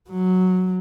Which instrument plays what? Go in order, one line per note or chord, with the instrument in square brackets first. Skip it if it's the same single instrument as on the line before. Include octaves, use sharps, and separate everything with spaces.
[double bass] F#3